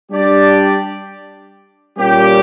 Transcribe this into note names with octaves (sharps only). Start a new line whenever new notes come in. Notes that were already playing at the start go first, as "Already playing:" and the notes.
G3 D4 G4 D5
A#2 G3 A#3 C#4 G4